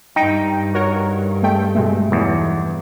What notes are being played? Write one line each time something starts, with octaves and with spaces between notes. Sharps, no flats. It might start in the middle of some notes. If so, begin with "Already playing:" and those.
G2 D#4 G5
F#4 A#4 C#5
G#3 A3 G5
B2 G#3 A3
B1 E2